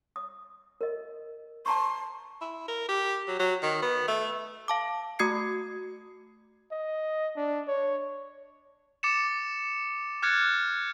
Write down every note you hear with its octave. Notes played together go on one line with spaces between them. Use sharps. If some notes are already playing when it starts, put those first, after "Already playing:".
D#6
A#4 D#5
A5 A#5 C6 C#6
E4
A#4
G4
F#3
F#3
D#3
B3
A3
F5 A5 D6
A3 F#4 D#6 G#6 C7 C#7
D#5
D4
C#5
D6 A6 C#7 E7
D6 F6 F#6 G#6 A6 C#7